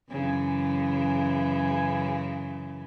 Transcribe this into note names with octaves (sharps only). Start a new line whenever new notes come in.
F#2 C#3 E3